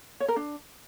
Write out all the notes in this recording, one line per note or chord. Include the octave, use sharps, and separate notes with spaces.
C#5
A#4
D4